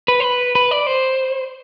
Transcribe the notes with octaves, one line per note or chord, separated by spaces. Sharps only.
B4
C5
B4
B4
D5
C5